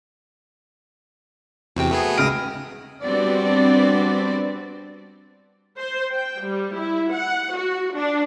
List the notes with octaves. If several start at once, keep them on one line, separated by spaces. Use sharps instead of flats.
E2 C3 F#4 G5
A3 B3 G#4
C#2 D#6 F6 A#6 D7
G3 B3 C4 D4 F#4 D5
C5
G5
G3
E4
F#5
F#4
D4